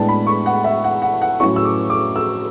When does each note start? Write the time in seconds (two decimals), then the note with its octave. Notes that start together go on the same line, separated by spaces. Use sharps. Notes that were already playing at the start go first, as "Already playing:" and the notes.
Already playing: A2 G#3 B3 D4 A5
0.08 B5
0.27 C#6
0.46 F#5
0.64 E5
0.84 F#5
1.02 F#5
1.22 F#5
1.40 A2 F#3 C#4 E4 C#6
1.56 E6
1.65 D6
1.90 D6
2.16 E6